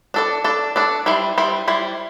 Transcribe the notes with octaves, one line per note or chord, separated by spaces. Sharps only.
D4 A4 D5
D4 A4 D5
D4 A4 D5
G3 E4 C5
G3 E4 C5
G3 E4 C5